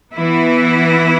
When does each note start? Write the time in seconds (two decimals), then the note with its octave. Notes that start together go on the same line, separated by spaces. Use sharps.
0.15 E3 B3 E4